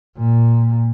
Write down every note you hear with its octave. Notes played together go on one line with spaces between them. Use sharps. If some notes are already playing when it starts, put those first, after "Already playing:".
A#2